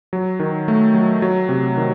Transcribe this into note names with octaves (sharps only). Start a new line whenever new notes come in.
F#3
D#3
A3
F#3
F#3
C3
D#3